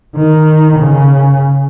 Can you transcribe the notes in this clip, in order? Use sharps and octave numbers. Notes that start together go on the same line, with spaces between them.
D#3
C#3